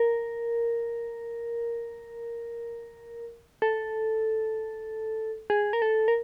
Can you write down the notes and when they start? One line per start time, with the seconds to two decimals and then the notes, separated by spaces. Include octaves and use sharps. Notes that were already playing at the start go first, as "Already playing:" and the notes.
Already playing: A#4
3.62 A4
5.50 G#4
5.73 A#4
5.82 A4
6.08 A#4